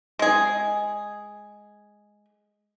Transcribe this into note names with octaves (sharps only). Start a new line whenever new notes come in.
G#3 G#4